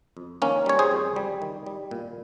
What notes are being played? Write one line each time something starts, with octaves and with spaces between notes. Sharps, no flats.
F2
D#3 A#3 C#4
G3 C#5
G#4 C5
F2
G3
D#3
G3
A#2